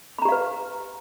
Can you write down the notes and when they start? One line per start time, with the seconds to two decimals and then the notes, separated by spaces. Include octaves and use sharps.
0.19 B5
0.22 A#5
0.25 G4
0.29 F5
0.32 B4